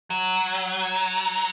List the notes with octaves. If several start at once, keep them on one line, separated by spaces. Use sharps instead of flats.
F#3